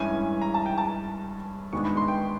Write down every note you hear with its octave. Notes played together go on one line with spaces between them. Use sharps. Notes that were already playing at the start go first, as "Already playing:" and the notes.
Already playing: G2 E3 G#3 C#4 E4 G#5
A#5
A5
G5
A5
G#2 D#3 G#3 B3 D4 C#6
B5
C6
G5